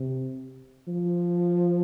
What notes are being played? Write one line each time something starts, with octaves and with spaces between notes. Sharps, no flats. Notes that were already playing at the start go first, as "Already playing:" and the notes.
Already playing: C3
F3